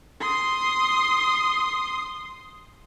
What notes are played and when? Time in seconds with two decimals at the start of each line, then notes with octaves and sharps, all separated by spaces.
0.20 C6 D#6